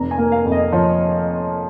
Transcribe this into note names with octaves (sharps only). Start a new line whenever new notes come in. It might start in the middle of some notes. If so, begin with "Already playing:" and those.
Already playing: F1 A#5
G#5
A#3
F5
F2
D#5
F3 C#5